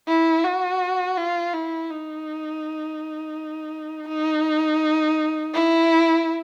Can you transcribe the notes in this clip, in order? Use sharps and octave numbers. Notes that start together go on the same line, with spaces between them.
E4
F#4
F4
E4
D#4
D#4
E4